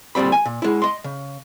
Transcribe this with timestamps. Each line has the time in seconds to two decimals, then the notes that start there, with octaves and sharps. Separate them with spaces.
0.15 D2 A#2 G3 C4 B5
0.32 G#5
0.45 A#2
0.62 G#3 E4
0.82 D#5 C6
1.04 C#3